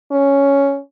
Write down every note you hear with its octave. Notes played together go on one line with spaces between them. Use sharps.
C#4